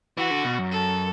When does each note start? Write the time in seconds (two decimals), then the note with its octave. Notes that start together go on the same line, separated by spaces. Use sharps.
0.17 E3 F#4
0.31 D3
0.44 B2
0.58 F#2
0.71 A4